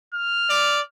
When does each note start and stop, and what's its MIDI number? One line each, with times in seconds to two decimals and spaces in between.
0.14 0.84 89
0.50 0.81 74